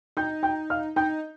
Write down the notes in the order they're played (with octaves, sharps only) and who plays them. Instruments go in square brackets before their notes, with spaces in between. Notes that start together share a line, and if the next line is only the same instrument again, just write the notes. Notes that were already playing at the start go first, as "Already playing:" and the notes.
[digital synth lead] D#4 [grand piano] G5 G6
[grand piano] G5 G6
F5 F6
[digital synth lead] D#4 [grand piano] G5 G6